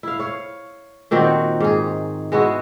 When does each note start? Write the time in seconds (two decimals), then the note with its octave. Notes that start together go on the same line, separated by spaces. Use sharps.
0.03 E4 F5
0.19 C#5 F5
1.11 A#2 D#3 C4 F#4
1.60 G#2 G#4
2.32 G#3 B3 E4 F#4